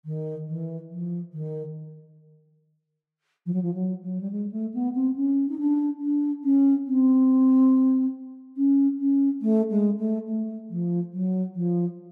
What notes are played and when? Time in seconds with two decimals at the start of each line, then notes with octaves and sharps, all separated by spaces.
0.05 D#3
0.47 E3
0.89 F3
1.32 D#3
3.46 F3
3.53 F#3
3.62 F3
3.74 F#3
4.02 F#3
4.20 G3
4.31 G#3
4.51 A3
4.74 B3
4.94 C4
5.15 C#4
5.48 D#4
5.58 D4
6.00 D4
6.44 C#4
6.86 C4
8.57 C#4
8.99 C#4
9.41 A3
9.70 G#3
9.98 A3
10.27 A3
10.69 F3
11.12 F#3
11.55 F3